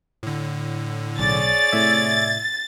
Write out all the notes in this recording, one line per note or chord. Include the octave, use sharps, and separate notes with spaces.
A2 D3
B1 G#4 C#5 D5 A6
A2 C3 E5 G#6